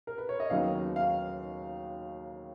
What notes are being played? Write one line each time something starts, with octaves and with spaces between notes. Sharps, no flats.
A#4
B4
C#5
D#5
D#2 C#3 F#3 B3 D#4 F5
F5